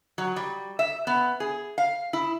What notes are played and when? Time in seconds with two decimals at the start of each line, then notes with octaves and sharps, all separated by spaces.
0.18 F#3
0.36 G3
0.79 E5
1.07 B3
1.40 G#4
1.78 F5
2.13 E4